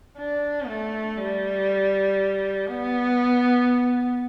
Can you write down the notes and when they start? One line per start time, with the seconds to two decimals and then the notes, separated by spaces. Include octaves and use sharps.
0.18 D4
0.67 A3
1.18 G3
2.68 B3